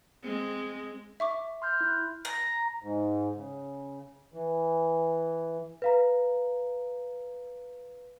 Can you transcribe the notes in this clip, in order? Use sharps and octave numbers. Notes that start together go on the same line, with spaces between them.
G#3 C4
E5 C#6 D6
C6 F6 G6
E4 F#6
A#5
G#2
C#3
E3
B4 F5 A#5